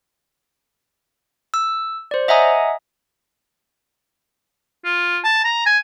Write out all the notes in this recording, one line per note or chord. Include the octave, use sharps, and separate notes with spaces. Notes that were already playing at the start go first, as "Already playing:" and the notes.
E6
C5 D5
D#5 E5 F#5 G#5 A#5 D#6
F4
A5
A#5
G#5